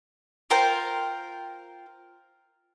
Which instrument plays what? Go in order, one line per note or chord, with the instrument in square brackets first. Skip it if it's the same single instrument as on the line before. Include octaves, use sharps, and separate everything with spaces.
[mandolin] F4 A#4 C5 G5